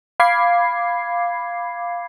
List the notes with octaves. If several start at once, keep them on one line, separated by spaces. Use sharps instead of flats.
F5 B5 D6 G#6 C7